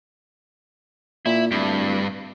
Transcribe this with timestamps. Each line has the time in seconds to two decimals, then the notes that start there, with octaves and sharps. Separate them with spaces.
1.26 A#2 E4
1.51 D1 G2